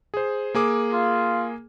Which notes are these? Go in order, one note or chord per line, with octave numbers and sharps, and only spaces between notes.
G#4 C5
A#3 G#4 D6
F4